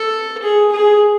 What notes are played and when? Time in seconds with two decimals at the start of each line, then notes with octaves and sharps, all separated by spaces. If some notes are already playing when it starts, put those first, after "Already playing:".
Already playing: A4
0.43 G#4
0.72 G#4